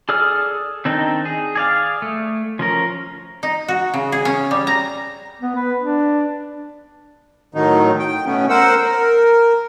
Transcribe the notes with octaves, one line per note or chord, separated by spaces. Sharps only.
G#4 A4 D5 D#6 F6
D#3 C4 D4 D#4
G#4
G#4 D5 F5
A3
F3 C#4 A#4
D#4
F#4
C#3
G#4
C#4
G3
A#5
B3
B4
D4
A2 D#3 F#3 D#4
G5
B2 A3 B3 C#4
A#4 C5 F#5 E6
A#4